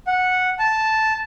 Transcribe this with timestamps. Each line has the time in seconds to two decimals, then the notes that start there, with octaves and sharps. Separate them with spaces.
0.07 F#5
0.59 A5